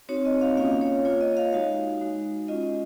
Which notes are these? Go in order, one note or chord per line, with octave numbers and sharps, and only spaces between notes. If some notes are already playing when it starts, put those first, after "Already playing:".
C4 D#4 F#4 C#5
D#5
F5
A#3 C#4 F4 F5
C#5
A#3 F4 C#5
D#5
F5
G#3 D#4 F#4 F5
G#3 D#4 F#4
G#3 C#4 F4 D#5